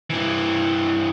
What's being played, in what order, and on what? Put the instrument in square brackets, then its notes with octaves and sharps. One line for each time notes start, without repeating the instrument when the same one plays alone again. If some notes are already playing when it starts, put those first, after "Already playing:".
[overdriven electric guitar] G2 E3